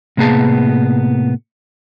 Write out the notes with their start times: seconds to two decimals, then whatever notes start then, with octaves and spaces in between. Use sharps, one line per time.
0.17 A2 C3 A#3 B3 G#4 A5